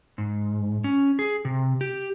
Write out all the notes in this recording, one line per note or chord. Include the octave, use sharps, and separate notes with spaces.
G#2
C#4
G#4
C3
G4